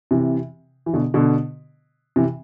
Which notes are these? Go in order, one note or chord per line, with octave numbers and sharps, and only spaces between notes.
C3 E3
E3
B2 D3
B2 D3
C3 E3